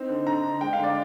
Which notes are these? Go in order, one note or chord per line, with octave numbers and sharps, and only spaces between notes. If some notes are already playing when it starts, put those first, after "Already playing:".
Already playing: C4 D#4
D3
D3 A#5
D3
G#3 G5
F5
D3 D5